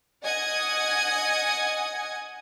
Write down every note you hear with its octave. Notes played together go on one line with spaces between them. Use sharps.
D#5 F#5 G#5 D#6 G#6